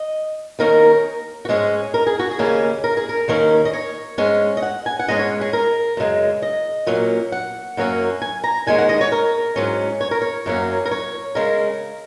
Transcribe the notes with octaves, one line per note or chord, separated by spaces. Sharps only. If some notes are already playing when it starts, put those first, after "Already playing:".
Already playing: D#5
D#2 D#3 A#3 C#4 A#4
F#4
G#2 G#3 C#4 G#4
A#4
G#4
F#4
G#4
D#2 C#3 A#3 C#4
A#4
G#4
A#4
D#2 D#3 A#3 C#4
D#5
C#5
G#2 G#3 C#4
D#5
F#5
G#5
F#5
G#2 G#3 C#4 D#5
C#5
G#4
A#4
F#2 C#3 G#3
D#5
A#2 F#3 A#3 C#4
F#5
F#2 F#3 A#3 C#4
G#5
A#5
D#2 D#3 G#3 C#4 G#5
F#5
D#5
C#5
A#4
G#2 F#3 C#4
C#5
A#4
C#5
F#2 F#3 A#3 C#4
A#4
C#5
C#3 G#3 C#4 A#4